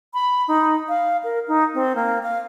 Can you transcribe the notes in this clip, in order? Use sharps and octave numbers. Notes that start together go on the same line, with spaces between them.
B5
D#4
F5
A#4
D#4
C4
A#3
F5